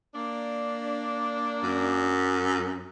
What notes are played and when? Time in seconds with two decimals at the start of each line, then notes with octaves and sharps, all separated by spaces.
0.15 A#3 D4
1.63 F#2